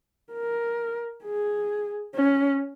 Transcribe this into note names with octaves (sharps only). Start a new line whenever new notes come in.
A#4
G#4
C#4